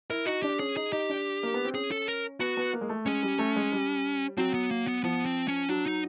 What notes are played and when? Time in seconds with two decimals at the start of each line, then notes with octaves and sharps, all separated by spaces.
0.10 E4 A#4
0.26 D#4 F#4
0.43 D4 G4
0.59 C#4 G#4
0.76 D#4 G#4
0.92 D#4 G4
1.10 D4
1.43 A#3
1.54 B3
1.65 C4
1.74 C#4 G#4
1.91 A4
2.08 A#4
2.40 B3 F#4
2.57 B3
2.73 A#3
2.81 G#3
2.89 A3
3.06 G#3 C#4
3.23 G3
3.39 A3
3.56 G#3
3.72 G3
4.37 F#3 C4
4.54 B3
4.71 A#3
4.88 B3
5.04 F3 B3
5.26 C4
5.48 C#4
5.69 F#3 D4
5.86 D#4